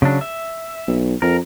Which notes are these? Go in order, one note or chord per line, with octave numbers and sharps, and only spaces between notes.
C#3 F#3 D4
E5
B1
F2 A#4